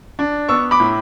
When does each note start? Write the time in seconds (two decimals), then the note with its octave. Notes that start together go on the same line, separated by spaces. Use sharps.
0.19 D4
0.49 B3 C#6 E6
0.71 B5 D6
0.80 A2